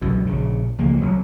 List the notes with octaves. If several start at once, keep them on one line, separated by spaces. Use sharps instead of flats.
C2 F#2 B2 E3
A#1 C#3
C#2 F3 A#3
C2 F#3